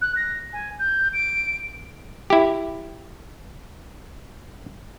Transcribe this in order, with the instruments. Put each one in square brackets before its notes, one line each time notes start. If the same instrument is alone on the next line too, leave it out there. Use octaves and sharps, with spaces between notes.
[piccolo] F#6
A#6
G#5
G6
D7
[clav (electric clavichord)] E4 G4